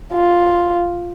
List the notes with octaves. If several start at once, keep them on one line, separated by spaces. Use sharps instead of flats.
F4